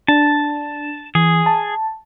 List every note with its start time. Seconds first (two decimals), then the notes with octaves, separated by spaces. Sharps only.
0.08 D4 A5
1.15 E3 G#4
1.46 A5